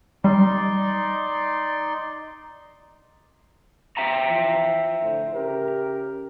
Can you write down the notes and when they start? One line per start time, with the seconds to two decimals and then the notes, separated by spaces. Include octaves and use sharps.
0.24 G3 D#4 D5 C6
3.97 E5 G5 A#5
4.29 E3 F3
5.02 A2 D3 C5
5.33 C#3 G4 A#4